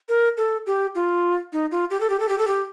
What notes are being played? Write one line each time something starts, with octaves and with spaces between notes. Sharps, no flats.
A#4
A4
G4
F4
D#4
F4
G4
A4
G4
A4
G4
A4
G4